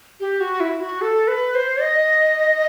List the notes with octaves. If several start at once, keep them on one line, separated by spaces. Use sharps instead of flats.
G4
F#4
E4
F#4
A4
B4
C5
D#5